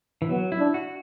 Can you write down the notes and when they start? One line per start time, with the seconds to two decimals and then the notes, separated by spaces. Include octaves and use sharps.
0.22 E3
0.29 F#3 B3
0.52 E4
0.59 D4
0.74 F#4